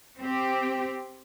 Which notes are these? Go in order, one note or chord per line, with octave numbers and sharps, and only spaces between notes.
C4 G4